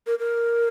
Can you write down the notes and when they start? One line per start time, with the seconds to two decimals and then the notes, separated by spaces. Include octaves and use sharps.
0.07 A#4
0.19 A#4